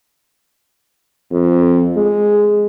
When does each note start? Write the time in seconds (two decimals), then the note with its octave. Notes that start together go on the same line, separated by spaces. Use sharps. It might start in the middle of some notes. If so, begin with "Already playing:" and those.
1.32 F2
1.97 G#3